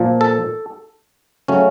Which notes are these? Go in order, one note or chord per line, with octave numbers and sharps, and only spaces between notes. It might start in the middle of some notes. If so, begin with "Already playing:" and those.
Already playing: A#2 F3 A#3
A4
C#3 F#3 A3 C#4